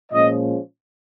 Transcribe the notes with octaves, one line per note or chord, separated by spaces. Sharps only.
A#2 F3 G#3 C#4 D#5